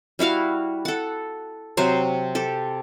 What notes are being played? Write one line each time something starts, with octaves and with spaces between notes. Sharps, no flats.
G3 E4 F#4 F5
A4 F#5
C3 F#3 C5
G4 A4